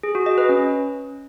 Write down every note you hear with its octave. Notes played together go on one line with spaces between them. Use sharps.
G#4
F#4
D#5
B4
C#4